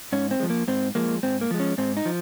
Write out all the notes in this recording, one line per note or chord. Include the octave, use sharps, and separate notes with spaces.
G#2 C#4
C4
F3 G#3
A#3
G#2 C4
F3 G#3 A#3
G#2 C4
A#3
F3 G#3
C#4
G#2 C4
D#4
F3